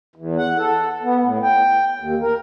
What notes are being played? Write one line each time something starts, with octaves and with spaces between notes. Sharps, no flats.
E2
F#5
A4
B3
A2
G5
D#2
A#4